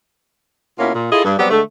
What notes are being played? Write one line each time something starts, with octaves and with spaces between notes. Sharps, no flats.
B2 A#3 C#4 E4 F4
A#2
E4 F4 G#4 A4 D#5
G2
F#3 G3 B3 C4 G4
D3 G#3 A3